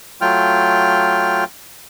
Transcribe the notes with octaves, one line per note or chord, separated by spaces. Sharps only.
F#3 A3 F4 G5 F6